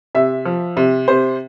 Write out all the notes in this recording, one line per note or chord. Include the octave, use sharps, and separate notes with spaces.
C3 E5
F3
C3
C3 C5